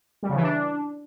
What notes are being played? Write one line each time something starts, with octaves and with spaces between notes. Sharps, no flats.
G3
C#3
E3
D4